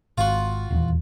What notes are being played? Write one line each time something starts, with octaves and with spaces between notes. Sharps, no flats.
G#1 F4 F#4
D#1 E2